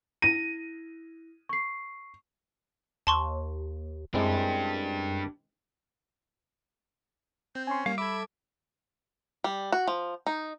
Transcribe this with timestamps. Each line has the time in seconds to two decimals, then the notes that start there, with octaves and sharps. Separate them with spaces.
0.22 E4 A#6 D#7
1.49 C#6 C7
3.07 D#2 A5 C6 C#6
4.14 F#2 G#3 C4 D4 E4 G4
7.55 C4 G6
7.67 C#4 G#5 C6
7.86 G3 A#3 F5
7.98 A4 E5 B5 D6 G#6
9.44 G3
9.72 F#4
9.88 F3
10.27 D#4